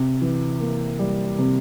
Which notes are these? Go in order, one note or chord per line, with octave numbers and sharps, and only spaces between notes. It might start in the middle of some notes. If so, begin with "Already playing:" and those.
Already playing: C3
E3
A#3
G3
C3